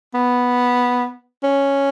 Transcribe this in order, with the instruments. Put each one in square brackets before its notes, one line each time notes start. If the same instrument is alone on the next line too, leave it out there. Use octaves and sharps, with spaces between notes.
[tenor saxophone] B3
C#4